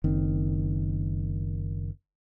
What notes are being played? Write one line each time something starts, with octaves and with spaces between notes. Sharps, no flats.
F#1 D#3 C4